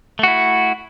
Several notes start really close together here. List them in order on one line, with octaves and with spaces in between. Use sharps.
A3 F#4 E4